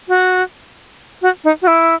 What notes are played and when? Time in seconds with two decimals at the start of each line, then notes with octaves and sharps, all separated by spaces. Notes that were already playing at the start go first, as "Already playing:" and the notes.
0.08 F#4
1.22 F#4
1.44 D#4
1.62 F#4
1.67 E4